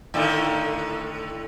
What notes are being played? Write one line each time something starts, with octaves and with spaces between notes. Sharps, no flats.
A2 D3 D#3